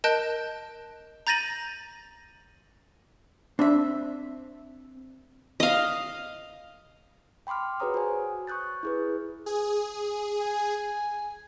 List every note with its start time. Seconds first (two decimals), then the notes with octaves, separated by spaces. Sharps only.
0.04 A#4 D#5 A5 F#6 G6 D7
1.27 A#5 G6 A6 A#6 D#7 F#7
3.59 C4 D4 E5
5.60 D#5 F5
7.47 G5 B5 C6 D6 F6
7.80 F#4 G#4 B4 C#5 A#5 D#6
7.94 F#4 C5 G#5
8.47 C#6 D#6 F#6 G6 A6
8.83 E4 G#4 B4
9.46 G#4
10.41 G#5